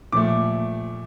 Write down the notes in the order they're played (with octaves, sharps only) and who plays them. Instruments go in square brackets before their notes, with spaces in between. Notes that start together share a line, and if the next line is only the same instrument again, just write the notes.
[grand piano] A#2 F3 A3 D6